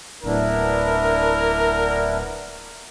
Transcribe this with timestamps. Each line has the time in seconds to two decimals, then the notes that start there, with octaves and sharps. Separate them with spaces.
0.24 D1 B3 D4 E4 A#4